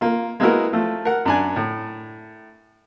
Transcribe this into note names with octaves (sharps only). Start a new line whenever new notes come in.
A#3 F4
G#3 A#3 B3 E4 F#4 A#4
F3 A3
A#4 F#5
F#2 D4 G#5
A2